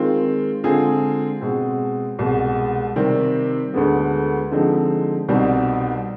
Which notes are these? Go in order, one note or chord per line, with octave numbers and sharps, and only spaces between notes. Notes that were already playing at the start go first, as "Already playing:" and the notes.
Already playing: D#3 G#3 C4 F4
D3 G#3 C4 F4 G#4
B2 G#3 C4
C2 B2 G#3
C3 D#3 G3 C4
D2 D3 G#3 B3
D3 F3 G#3 C4 D#4
C2 B2 G3 C4 D#4